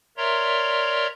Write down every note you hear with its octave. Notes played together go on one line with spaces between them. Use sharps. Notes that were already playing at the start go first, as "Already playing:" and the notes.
A#4 C#5 D5 E5 A#5 C6